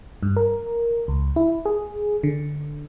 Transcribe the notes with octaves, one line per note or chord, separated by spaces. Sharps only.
G2
A#4
C#2
E4
G#4
D3